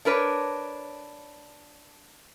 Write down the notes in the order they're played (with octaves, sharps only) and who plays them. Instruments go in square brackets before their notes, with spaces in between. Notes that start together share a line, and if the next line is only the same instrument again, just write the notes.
[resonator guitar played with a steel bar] D4 A#4 B4 C#5